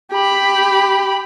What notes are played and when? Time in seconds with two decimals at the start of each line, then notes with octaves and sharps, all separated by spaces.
0.13 G4 B5